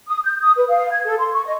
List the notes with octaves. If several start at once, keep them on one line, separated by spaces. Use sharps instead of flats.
D#6
G6
D#6
B4
F5
G#6
A4
C6
C#6
D#5